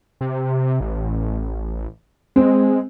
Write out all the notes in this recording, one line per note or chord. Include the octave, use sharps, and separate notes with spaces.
C3
A1
G#3 C4